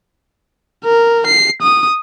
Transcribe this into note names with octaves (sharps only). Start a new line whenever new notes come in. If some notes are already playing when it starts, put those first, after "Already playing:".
A#4
C7
D#6